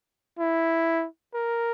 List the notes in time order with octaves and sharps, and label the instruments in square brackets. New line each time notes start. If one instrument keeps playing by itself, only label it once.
[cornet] E4
A#4